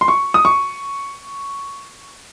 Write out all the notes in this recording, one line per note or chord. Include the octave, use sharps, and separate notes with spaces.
C6
C#6
D#6
C#6